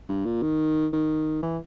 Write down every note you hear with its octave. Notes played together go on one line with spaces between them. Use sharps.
G2
A#2
D#3
D#3
E3